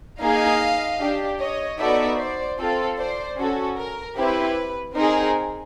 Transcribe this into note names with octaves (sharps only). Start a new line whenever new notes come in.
A#3 D#4 G#4 D#5 F5
D4 G4
C#5 D#5
B3 D#4 F#4 A4 D5 E5
C5 D5
C4 F4 A4
C5 D5
C#4 F#4 A4
A#4
C4 E4 G4 B4
C4 D#4 G#4 A#4